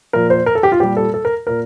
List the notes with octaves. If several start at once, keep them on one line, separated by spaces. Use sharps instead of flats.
A#2 F3 A#4
C5
A#4
A4
G4
F4
A#2 G3 G4
A4
A4
A#4
A#2 A#4